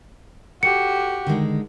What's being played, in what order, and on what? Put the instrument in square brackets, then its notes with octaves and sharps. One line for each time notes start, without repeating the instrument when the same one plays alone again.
[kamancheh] F#4 G4 [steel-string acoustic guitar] A4 [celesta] C#7
[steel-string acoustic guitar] D3 D#3 G#3